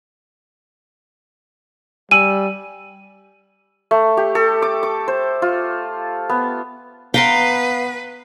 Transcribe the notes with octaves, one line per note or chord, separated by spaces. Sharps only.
G3 G#5 E6 D#7 F#7
A3
G4
A4
D6
D6
C5
F4
B3
B3 B4 F5 G5 A#5 C6